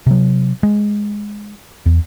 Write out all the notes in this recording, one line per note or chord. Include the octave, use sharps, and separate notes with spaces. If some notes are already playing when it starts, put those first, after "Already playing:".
C3 F#3
G#3
E2